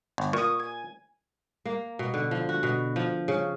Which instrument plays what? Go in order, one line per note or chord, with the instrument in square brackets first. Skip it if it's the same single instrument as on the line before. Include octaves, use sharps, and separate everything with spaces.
[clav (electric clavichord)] G1
[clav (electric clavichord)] A#2 [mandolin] C#6 D#6
[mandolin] G#5
[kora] A#3
B2
D3
F3
F#4
B2
F3
C#3